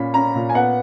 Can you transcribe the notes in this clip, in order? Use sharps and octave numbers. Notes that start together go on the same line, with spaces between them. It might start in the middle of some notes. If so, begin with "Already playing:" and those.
Already playing: A#2 C#4 B5
C#4 A#5
A#2
G#5
B3 F#5